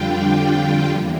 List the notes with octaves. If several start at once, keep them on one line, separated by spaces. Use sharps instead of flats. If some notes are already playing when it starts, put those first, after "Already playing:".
Already playing: F2 D3 G3 D4 F4 G5
E2 C3 E3 A#3